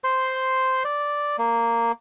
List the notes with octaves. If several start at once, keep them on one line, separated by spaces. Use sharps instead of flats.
C5 C6
D5
A#3